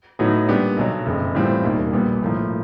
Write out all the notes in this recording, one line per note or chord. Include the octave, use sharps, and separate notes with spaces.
A2 F#3 B3 D#4 F#4
A#2 G3 B3 D4 G4
B1 B2 F#3
F#1 F2 C#3
A2 E3 G3 C4 F4
E1 D#2 D#3 G3
A#1 A#2 G3 B3
B1 A2 F3 A#3